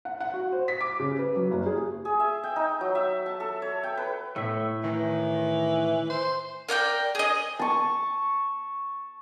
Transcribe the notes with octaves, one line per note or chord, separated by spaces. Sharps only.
F#5
F#5
F#4
C5
B6
D6
C#3
B4
F#3
F#1
G#4
G#4
E5
G5
D#4
F#3
E5
A5
A4
C#5
G5
B4
A2 A3 E5
D#3 E3
C5
A#4 D5 F#5 G5
G#4 D#5
A5 C#6